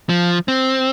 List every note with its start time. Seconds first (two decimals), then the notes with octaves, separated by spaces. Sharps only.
0.09 F3
0.48 C4